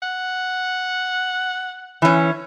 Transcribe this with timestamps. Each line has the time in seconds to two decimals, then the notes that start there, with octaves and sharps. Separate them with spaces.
0.03 F#5
2.02 E3 C#4